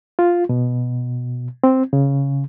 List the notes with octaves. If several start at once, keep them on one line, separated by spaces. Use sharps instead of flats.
F4
B2
C4
C#3